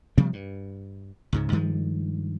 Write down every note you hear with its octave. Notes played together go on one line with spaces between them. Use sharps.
C3 F3 G3 A#3
G2
C#2 G#2 C#3
G2 D#3 F3 G#3